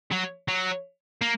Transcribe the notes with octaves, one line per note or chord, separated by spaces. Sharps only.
F#3
F#3
A#3